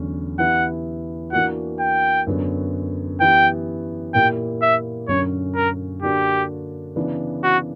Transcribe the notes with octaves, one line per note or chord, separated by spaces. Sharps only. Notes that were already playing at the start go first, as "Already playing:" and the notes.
Already playing: E2 D3 F#3 C#4
E3 B3 E4 G4 F#5
E3 A#3 D4 F#4 F#5
G5
F#2 D3 F#3 B3 F#4
E3 B3 E4 G4 G5
A#2 A#3 E4 G4 G5
E5
F#2 D3 F#3 C#4 C#5
A#4
D3 A#3 D4 F#4 G4
C#3 E3 B3 D4
F#4